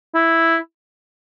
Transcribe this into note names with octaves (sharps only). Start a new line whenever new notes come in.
E4